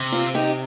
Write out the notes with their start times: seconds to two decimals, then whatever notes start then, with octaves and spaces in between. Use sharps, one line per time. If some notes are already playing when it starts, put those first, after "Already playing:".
Already playing: C3
0.12 C4 F4
0.34 D#4 G4